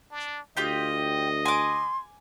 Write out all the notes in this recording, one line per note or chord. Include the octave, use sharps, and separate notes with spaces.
D4
D2 F4 G4 D#5 G5
G#5 C6 D6